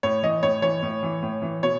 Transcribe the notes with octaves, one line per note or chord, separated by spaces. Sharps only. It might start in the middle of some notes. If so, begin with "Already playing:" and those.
A2 C#5
E3 D#5
A2 C#5
E3 C#5
A2
E3
A2
E3
B2 C#5